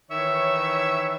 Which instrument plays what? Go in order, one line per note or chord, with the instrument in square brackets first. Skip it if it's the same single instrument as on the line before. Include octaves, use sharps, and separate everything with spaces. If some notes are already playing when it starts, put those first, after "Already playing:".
[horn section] D#3 E3 C#5 [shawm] E5